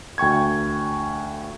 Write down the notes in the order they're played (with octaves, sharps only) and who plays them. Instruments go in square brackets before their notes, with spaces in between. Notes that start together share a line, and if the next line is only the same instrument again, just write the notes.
[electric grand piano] D2 G5 C#6 G#6